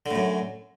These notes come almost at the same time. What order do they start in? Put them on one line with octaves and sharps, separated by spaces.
D3 A2 F#2